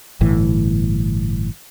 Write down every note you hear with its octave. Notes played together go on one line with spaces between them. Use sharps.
G1 A2 E3